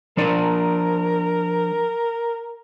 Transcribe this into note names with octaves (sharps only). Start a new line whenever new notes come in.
F3 D4 A#4 D5